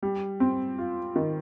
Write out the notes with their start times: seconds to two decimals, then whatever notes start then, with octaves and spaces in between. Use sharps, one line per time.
0.03 G3
0.40 C4
0.78 F4
1.16 D#3